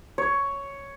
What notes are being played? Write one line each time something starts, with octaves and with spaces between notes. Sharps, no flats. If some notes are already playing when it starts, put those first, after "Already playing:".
C#5